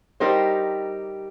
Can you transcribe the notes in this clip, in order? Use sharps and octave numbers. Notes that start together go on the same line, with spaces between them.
G3 D#4 G4 A#4 C5